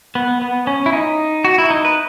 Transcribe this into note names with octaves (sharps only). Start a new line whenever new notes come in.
B3
B3
C#4
E4
D#4
F#4
E4
D#4
B4